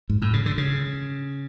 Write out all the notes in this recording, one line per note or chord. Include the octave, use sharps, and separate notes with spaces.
G#2
A2
C#3
D3
C#3